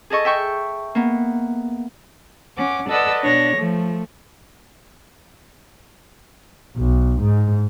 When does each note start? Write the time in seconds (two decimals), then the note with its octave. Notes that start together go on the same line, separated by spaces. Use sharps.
0.10 G#4 A4 D#5 C#6
0.25 E5 G5 C#6
0.95 A#3 B3
2.57 C#4 F#5 D6
2.89 A4 B4 D5 D#5 F#5 E6
3.23 B2 D4 C#5 A#6
3.57 F3 A3
6.77 B1
7.21 G#2